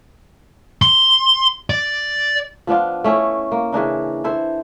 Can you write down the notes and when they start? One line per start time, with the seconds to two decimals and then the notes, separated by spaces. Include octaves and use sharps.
0.82 C6
1.70 D5
2.67 F3 B3 D4 F4
3.04 A3 C#4 E4 A4
3.52 A#3
3.72 C#3 E3 D4 D#4
4.24 E4 A4 C5